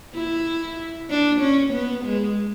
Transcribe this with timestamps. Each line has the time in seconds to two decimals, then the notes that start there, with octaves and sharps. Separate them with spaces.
0.14 E4
1.10 D4
1.41 C#4
1.73 B3
2.05 G#3